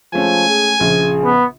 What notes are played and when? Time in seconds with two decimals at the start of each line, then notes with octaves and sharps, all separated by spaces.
0.14 F3 G#3 A3 C#4 G#5
0.50 G#4
0.80 A#1 C#3 F3 G#4
1.24 B3